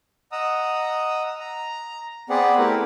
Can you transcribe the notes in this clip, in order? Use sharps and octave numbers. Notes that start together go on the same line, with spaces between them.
D#5 F#5 A#5 D#6 E6
A#5
B3 C4 G#4 B4 D5 F#5
A3 C4 E4 G4 A#4 B4